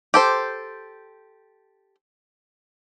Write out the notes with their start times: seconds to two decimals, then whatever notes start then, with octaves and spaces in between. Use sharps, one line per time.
0.14 G4 A4 C5